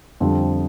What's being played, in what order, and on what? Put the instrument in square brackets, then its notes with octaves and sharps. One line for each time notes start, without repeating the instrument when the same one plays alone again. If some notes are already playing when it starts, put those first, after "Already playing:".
[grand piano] F2 D3 G3 C4